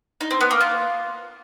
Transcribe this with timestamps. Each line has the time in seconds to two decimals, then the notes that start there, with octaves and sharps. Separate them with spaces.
0.21 D#4
0.31 C4
0.41 B3
0.51 A#3
0.61 F4